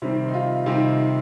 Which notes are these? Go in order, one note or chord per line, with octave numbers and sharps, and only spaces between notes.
C3 D#3 G3 C4
D#4
F4
C3 D#3 G3 C4 D#4